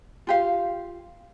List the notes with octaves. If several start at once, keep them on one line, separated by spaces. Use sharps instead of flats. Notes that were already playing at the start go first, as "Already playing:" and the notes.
F4 G4 F5